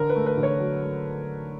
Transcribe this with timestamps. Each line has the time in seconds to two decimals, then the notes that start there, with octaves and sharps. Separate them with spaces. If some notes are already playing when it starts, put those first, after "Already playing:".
Already playing: D3 A#4
0.10 B4
0.15 A3
0.26 B4
0.37 D3
0.43 C#5
0.60 F#3
0.82 A3